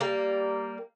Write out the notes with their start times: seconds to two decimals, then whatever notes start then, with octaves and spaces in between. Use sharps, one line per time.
0.01 G3 A#3